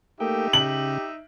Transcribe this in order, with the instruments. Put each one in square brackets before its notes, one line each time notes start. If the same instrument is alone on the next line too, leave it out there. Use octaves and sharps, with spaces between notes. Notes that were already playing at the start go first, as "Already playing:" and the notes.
[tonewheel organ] A3 A#3 G5 [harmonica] D#4 E5 [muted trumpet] G4
[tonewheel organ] C#3 [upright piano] F#7